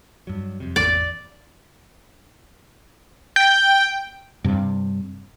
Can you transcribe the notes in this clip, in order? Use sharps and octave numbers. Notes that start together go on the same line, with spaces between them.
G2 F#3
F2 C3
G#1 E2 D5
G5
G2 C3